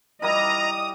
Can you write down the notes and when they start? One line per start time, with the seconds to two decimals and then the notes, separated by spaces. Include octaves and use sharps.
0.22 G3 E4 A#4 D#5 A#5 D#6